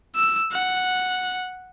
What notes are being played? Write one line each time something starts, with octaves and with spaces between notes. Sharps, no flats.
E6
F#5